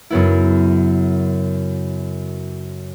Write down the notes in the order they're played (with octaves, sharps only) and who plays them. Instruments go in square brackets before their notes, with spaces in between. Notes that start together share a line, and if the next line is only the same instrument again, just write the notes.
[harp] F#2 C#3 B3 E4